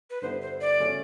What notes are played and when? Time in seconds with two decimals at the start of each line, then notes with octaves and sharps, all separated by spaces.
0.10 B4
0.22 G2 D3 G3 B3 E4 C5
0.42 C5
0.61 D5
0.80 C#3 F#3 A3 C#4